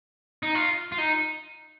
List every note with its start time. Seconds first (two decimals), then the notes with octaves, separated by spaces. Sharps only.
0.43 D#4
0.55 F4
0.92 F4
0.98 D#4